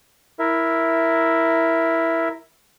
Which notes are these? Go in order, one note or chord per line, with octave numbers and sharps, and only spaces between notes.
E4 A#4 E5